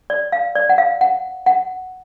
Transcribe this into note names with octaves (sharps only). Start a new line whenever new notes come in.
D5
F5
D5
F#5
F5
F#5
F#5